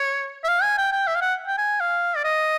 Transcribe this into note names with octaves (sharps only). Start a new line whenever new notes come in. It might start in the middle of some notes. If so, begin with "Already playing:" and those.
Already playing: C#5
E5
F5
G#5
G5
G5
E5
F5
F#5
G5
G#5
F5
D5
D#5